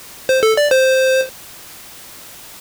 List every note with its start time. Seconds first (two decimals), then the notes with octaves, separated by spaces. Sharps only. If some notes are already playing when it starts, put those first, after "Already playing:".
0.29 C5
0.43 A4
0.57 D5
0.71 C5